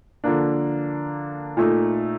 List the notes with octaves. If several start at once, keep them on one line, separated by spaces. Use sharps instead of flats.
D3 F3 A#3 D4
A#2 A3 D#4